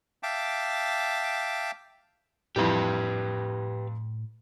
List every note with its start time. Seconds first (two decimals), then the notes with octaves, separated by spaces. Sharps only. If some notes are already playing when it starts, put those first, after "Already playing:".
0.23 E5 F5 G5 A5 D6
2.56 F2 A2 E3 G3 G4 B4